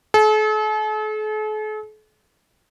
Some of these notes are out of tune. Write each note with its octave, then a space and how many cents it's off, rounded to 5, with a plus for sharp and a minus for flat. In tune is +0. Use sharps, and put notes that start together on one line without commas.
A4 -45